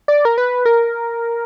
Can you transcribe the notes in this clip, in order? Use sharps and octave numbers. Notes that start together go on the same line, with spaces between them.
D5
A#4
B4
A#4